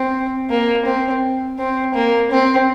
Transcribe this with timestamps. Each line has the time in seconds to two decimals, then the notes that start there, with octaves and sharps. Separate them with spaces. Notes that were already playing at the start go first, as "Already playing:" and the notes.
Already playing: C4
0.50 A#3
0.85 C4
1.58 C4
1.94 A#3
2.31 C4